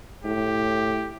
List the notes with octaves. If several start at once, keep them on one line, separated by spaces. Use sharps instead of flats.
A2 G4